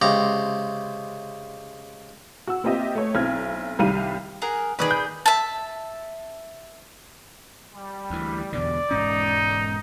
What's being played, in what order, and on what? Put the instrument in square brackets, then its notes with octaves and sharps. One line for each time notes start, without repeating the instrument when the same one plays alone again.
[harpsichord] C#2 C3 A#5
[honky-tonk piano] F#4 E6
A#3 C4 F4 G4 D#5 E5
A3 C#5
B1 C4 E4 F6 G#6
C2 D#3 G3 F5 D#7
[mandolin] G#4 A#4 F#5
[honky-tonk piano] D#3 B4 [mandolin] G#4 D5 B5
[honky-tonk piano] G6
[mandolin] E5 A5
[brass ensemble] G3
[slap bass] D2 E3
[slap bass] E2 B2 D3 [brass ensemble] D5
[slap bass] E1 G#2 C#4 [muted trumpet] D#4